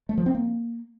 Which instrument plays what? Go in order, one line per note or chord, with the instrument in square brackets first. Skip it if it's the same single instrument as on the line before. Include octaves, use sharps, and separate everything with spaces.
[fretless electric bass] A3
F3
C4
A#3